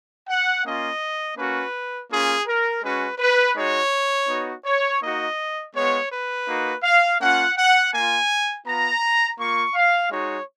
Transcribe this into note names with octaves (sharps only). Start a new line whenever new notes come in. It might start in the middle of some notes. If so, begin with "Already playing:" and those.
F#5
A#3 C#4 F4 D#5
A#3 C#4 F#4 B4
A#3 C#4 F4 G#4
A#4
G#3 C#4 F#4 B4
B4
G#3 D#4 F#4 C#5
B3 D#4 F#4
C#5
A#3 D#4 F#4 D#5
G#3 B3 F4 C#5
B4
A#3 D#4 F#4
F5
A#3 C#4 F4 F#5
F#5
A#3 F4 G#5
B3 F4 A#5
A#3 F4 C#6
F5
G#3 D#4 F#4 C#5